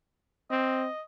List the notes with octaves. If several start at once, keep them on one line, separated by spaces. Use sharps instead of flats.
C4 D#5